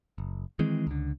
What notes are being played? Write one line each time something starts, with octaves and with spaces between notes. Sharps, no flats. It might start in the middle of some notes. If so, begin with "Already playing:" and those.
F#1
D#3 E3 G#3 C4
C#2 D3